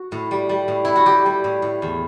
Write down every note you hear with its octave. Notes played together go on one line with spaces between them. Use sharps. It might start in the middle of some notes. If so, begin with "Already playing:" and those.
Already playing: F#4
A2
G3
G3
A2
A2 E4
F#4
G3 G4
G3
A2
A2
E2